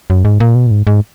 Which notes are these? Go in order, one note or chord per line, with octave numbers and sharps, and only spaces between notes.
F#2
G#2
A#2
B2
A#2
G#2
G#2